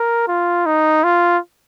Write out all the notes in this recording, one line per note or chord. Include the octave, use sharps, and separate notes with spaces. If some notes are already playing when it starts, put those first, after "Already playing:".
Already playing: A#4
F4
D#4
F4